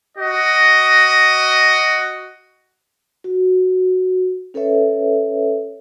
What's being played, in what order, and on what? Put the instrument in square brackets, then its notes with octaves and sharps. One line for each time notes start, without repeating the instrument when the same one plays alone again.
[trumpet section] F#4 D#5
[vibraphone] F#4
C#4 A4 B4 C#5 E5